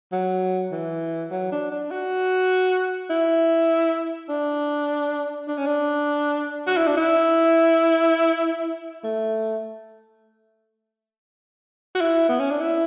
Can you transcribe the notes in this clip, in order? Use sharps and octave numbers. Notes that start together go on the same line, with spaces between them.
F#3
E3
F#3
D4
D4
F#4
E4
D4
D4
C#4
D4
F#4
E4
D4
E4
A3
F#4
E4
B3
C#4
D4
E4